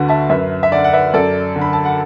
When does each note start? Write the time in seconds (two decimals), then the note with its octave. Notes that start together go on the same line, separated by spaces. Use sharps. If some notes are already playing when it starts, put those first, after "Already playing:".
Already playing: D2 D3 F#4 B4
0.08 E5 A5
0.30 F#2 B4 E5
0.63 E5
0.72 D3 D5 F#5
0.84 F#5
0.93 B4 E5
1.14 F#2 A4 D5
1.56 D3
1.61 B5
1.73 A5
1.85 F#5